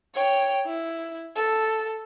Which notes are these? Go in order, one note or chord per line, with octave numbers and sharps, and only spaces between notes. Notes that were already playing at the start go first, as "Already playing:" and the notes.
C#5 G5
E4
A4